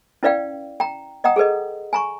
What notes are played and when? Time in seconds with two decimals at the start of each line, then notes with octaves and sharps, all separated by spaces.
0.23 C#4 E4 B4 D5 F5 G5
0.80 G5 A#5
1.24 D#5 F#5 G5 A#5 D#6
1.36 G#4 A4 B4 D#5
1.93 G#5 A#5 C#6